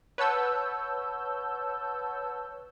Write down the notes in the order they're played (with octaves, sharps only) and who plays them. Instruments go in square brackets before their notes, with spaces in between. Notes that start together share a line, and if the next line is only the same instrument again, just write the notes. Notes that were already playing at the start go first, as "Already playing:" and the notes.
[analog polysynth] B4 C#5 F#5 A5 E6 G6